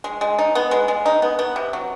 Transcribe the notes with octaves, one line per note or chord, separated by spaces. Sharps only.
G#3
G#3
D#4
B3
G#3
G#3
D#4
B3
B3
C3
F#3